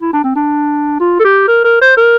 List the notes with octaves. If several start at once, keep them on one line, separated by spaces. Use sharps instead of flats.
E4
D4
C4
D4
F4
A4
G4
A#4
A#4
C5
A#4